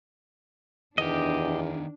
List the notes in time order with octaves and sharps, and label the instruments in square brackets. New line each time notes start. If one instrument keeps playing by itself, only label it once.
[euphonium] E2 [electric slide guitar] D#3 B3 [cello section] D4 [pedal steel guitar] G4 D#5